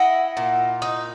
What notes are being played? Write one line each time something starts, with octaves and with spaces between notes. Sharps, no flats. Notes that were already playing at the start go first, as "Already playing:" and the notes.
Already playing: E4 D#5 F#5
A#2
D#4